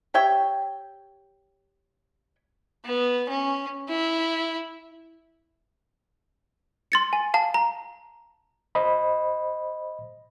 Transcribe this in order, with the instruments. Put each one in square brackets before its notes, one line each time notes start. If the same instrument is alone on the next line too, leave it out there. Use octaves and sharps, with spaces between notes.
[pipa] G4 C#5 E5 G5
[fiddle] B3
C#4
E4
[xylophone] C6 A6 C#7
G#5
F5 A5
A#5
[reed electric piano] C5 D#5 B5